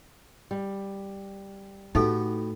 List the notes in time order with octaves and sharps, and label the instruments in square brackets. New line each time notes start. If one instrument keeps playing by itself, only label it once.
[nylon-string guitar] G3
[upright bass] A2 [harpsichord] B3 F#4 G4 [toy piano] D#4 A4